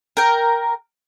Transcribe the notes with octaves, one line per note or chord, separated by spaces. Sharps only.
A#4 G5